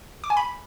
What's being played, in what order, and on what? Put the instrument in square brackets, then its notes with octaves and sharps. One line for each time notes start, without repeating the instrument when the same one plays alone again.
[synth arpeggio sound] D6
G#5
B5